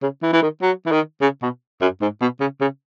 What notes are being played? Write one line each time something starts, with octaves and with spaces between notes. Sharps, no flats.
C#3
E3
E3
D#3
F#3
E3
D#3
C#3
B2
F#2
G#2
B2
C#3
C#3